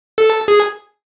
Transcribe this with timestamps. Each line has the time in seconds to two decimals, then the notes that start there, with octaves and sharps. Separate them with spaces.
0.18 A4
0.48 G#4